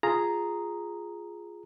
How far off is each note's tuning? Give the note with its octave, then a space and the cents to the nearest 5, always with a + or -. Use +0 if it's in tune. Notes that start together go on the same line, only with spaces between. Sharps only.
F4 +0 G#4 +0 A#5 +0